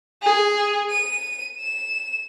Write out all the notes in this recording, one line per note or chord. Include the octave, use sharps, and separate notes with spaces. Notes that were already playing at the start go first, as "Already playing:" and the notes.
G#4
D#7
E7